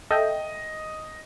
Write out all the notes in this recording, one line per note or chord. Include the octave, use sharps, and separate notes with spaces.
A4 D#5 E5 G5